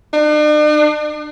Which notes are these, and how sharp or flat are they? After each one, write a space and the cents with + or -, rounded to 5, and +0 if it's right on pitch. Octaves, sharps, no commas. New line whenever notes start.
D4 +45